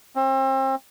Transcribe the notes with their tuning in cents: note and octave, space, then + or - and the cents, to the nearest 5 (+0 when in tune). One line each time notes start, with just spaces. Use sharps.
C4 +35